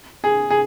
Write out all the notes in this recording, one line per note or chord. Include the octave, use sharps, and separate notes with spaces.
G#4
G#4